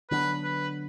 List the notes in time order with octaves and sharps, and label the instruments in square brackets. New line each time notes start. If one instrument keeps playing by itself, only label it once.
[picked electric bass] D3 F#3 B3 D4 [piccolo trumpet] B4
[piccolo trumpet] B4